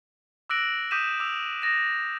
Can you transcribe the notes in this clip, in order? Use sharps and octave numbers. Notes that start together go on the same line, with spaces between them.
D6 E6 F#6 A#6 D7 F#7
D6 D#6 G6 B6 D#7 E7
D6 E6 F7
D#6 A6 A#6 E7